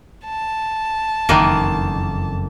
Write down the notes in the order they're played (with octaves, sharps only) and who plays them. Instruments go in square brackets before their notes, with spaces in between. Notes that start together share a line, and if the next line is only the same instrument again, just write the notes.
[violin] A5
[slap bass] F#1 F2 [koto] D#3 E3 A#3